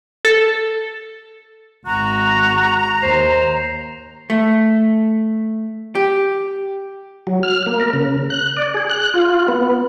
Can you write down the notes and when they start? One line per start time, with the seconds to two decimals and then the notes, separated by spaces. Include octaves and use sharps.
0.25 A4
1.86 G#1 F#4 A#5
3.03 D#2 C5
4.30 A3
5.95 G4
7.27 F#3
7.43 F6
7.66 A#3
7.80 A#4
7.93 C#3
8.30 F#6
8.57 D5
8.74 G#4
8.90 F#6
9.14 F4
9.48 B3